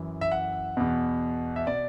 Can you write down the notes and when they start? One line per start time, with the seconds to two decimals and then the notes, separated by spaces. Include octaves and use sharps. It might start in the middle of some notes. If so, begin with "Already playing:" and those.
Already playing: F#2 E3
0.21 E5
0.32 F#5
0.77 E2 B2
1.56 E5
1.67 B2 D5